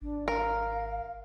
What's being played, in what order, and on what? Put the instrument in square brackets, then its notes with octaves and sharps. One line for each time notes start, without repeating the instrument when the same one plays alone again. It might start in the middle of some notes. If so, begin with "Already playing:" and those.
[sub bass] G#1 [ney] D4
[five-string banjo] A#4 [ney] F5